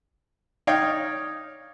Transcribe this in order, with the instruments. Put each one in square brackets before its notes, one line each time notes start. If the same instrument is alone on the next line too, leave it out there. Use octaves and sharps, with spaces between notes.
[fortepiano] D#4 C#5 D5 F5 G5